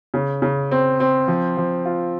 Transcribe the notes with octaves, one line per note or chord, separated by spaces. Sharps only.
C#3
C#3
C4
C4
F3
F3
F4